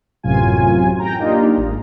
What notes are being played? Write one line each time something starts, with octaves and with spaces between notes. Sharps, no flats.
A1 F#2 C3 F#3 F4 G#5
G5 A#5
A#3 D4 D#4 F4 G4
G#1